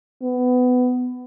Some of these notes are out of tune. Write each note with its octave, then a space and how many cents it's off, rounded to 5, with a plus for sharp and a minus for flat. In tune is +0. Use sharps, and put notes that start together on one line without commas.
B3 +20